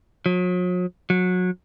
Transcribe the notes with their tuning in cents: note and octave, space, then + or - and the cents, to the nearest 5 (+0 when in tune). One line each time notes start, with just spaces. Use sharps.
F#3 -45
F#3 -25